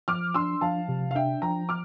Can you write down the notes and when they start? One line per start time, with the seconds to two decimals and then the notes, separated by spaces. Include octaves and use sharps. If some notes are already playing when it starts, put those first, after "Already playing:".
0.08 F3 D6 F6
0.34 D4 C6 E6
0.61 F3 F5 A5
0.88 C3
1.11 F5
1.15 D4 E5 G5
1.42 F3 G5 A#5
1.69 D6 F6